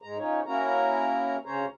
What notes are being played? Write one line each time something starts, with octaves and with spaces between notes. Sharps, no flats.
G#2 G#3 A#5
F3 C#4 D#4 C#5
A#3 C#4 E4 F#4 A#4 A#5
D2 C#3 C#4 C5 C#5 A#5